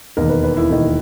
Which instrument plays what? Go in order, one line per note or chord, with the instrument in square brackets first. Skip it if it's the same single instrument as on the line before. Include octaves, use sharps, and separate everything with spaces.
[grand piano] E1 D#2 D#3 A#4
B4
B4
E4
E1 D#2 D#3